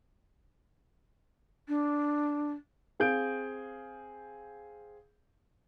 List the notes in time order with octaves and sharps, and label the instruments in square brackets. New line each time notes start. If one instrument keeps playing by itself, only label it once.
[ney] D4
[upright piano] C4 G#4 F5 G6 D7